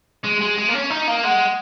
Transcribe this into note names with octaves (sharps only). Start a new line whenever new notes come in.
G#3
G#3
G#3
A#3
C#4
D#4
A#3
G#3 F#5